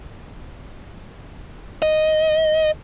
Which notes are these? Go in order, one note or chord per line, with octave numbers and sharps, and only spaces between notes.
D#5